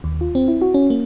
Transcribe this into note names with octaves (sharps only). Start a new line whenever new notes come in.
D#2
F4
C4
E4
F#4
C#4
A#3